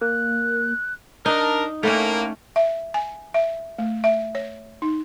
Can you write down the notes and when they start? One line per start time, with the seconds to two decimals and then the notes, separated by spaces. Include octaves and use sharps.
0.01 A#3 F#6
1.26 D4 D#4 A#4
1.83 A2 A3 A#3 C#4
2.56 E5
2.94 G#5
3.34 E5
3.79 A3
4.04 E5
4.35 C#5
4.82 D#4